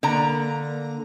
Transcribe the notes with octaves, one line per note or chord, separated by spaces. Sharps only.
D3 A#3 A#5